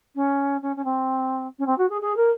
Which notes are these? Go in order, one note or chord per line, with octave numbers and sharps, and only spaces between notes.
C#4
C#4
C#4
C4
C#4
C4
F#4
G#4
G#4
A#4